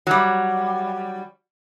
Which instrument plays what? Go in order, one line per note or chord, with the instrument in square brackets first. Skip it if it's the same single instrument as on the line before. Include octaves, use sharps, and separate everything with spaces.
[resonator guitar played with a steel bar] F#3 G3